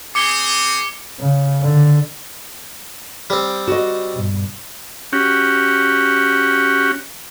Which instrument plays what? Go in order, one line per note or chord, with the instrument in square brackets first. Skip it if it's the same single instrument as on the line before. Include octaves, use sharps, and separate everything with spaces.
[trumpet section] C4 G#4 [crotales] D6 C#7 G7
[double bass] C#3
D3
[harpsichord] G3 C4
[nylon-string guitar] F#4 D#5
[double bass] G2 B2
[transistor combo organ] C#4 F#4 G4